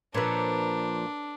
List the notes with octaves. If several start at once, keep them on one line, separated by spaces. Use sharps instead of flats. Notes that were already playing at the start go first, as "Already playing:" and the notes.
A#2 F3 D4 A4 B4 C#5 A#5